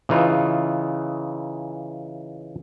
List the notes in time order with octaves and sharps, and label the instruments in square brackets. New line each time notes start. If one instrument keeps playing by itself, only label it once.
[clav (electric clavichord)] C#3 E3 D#4 F4